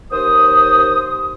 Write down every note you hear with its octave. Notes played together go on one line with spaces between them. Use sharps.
D#2 C5 D#6